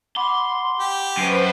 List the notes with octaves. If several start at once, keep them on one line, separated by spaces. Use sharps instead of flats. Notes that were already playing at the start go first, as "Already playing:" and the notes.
F#5 B5 C6 D6
G4
F#2 B4 C5 C7 D7 D#7